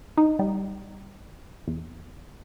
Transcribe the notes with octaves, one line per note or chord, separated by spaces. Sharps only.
D#4
G3
E2